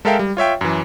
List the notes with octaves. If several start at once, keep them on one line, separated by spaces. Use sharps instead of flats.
G#3 A4 A#4 E5 F5 G5
G3
F4 C#5 E5 G5
F#2 E3